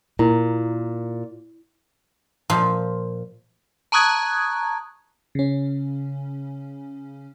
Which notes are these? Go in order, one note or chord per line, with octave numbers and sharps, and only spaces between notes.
A#2 E4
A#2 F3
A5 A#5 C#6 D#6 F#6 G#6
C#3 C#4